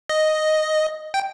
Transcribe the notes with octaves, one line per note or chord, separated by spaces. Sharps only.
D#5
G5